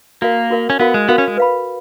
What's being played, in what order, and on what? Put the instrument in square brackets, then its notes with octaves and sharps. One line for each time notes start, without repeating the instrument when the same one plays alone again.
[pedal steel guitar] A#3 [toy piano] F#4 A#4 F5
[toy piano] F#4 A#4 F5
[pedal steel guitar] C#4
[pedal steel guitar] B3 [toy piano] F#4 A#4 F5
[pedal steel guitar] G#3
[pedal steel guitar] B3 [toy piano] F#4 A#4 F5
[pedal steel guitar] C#4
G#3
[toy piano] B4 F5 B5